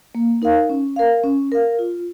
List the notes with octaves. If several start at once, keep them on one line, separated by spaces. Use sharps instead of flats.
A#3
D#4 A#4 F5
C#4
A#4 F5
C#4
A#4 F5
F4